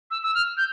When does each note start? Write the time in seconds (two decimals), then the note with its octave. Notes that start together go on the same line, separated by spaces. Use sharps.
0.11 E6
0.23 E6
0.35 F6
0.57 G6